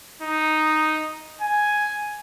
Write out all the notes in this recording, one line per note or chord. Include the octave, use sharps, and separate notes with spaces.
D#4
G#5